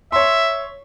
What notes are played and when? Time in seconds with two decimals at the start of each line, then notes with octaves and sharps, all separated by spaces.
0.12 C#5 E5 C6